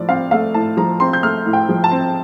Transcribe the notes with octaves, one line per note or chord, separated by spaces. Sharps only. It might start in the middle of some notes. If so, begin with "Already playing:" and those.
Already playing: A2 F3 D5
C4 F5
A3 F5
A2 A5
F3 A#5
C4 C6
G6
A3 F6
A2
G5
F3
A5
C4